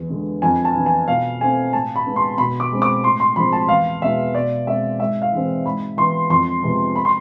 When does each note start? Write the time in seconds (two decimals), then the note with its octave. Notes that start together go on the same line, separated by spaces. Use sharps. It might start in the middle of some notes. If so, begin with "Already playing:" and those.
Already playing: E2
0.10 D3 G#3 B3
0.42 F2 G#5
0.65 A5
0.75 E3 B3
0.86 G#5
1.08 B2 F5
1.40 A3 C4 G#5
1.73 A2 A5
1.96 B5
2.06 G#3 B3
2.16 C6
2.38 B2 B5
2.60 D6
2.72 G#3 C4
2.82 D6
3.04 A2 C6
3.20 C6
3.36 F3 G#3 C4 B5
3.53 A5
3.69 E2 F5
4.02 B2 G#3 B3 E5
4.34 B2 D5
4.67 G#3 C4 E5
4.99 G#2 E5
5.22 F5
5.32 E3 G#3 C4
5.66 G#2 B5
5.97 E3 B3 C6
6.30 F2 C6
6.63 C3 F3 G#3 B3
6.96 B5
7.05 C6